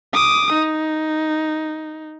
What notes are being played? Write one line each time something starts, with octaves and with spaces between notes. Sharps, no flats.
D6 D#6
D#4